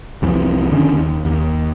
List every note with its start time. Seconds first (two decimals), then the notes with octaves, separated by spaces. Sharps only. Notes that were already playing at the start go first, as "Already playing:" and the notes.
0.22 C2 F2 E3
0.72 D3 D#3 C#4
0.94 D#2
1.25 D#2